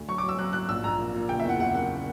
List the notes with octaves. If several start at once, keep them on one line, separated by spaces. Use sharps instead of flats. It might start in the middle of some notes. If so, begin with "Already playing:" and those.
Already playing: D2
F#3 C#6
D6
F#3
E6
F#3 F#6
F#3 F#6
A#1 E6
A#1 A#5
A#2
A#2
F#1 G5
E5
E2 F#5
F#1 F#5
F#1 F#5